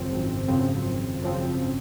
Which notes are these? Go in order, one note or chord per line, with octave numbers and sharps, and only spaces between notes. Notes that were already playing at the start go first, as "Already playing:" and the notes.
Already playing: G#1 F#2 C#3 F3 C4
G#1
F#2 C#3 F3 C4
G#1
F#2 C#3 F3 C4